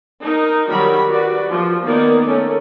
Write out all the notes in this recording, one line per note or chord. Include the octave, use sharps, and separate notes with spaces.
D#4 A#4
D#3 F#3 G3 F#4 A#4 B5
F#4 B4 D5
F3
D#3 A#3 B3 D#4 A#4 D5
A3 C#4